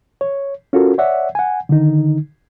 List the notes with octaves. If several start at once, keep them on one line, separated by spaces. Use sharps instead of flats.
C#5
C#4 F4 F#4 A4 A#4
C#5 D5 E5 F#5
F#5 G#5
D3 D#3 D#4